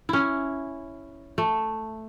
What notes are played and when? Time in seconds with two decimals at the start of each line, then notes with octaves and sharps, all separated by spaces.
0.09 C#4 E4
1.38 A3